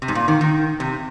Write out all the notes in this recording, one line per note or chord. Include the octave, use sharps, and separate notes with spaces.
C3
G#2
A#2
D#3
D#3
C3